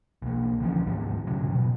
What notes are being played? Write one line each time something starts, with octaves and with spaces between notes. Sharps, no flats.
B1 A#3
D3 E3 F3 C#4
D2 G#2 G3 B3
E1 G#2 C#3 F#3
B2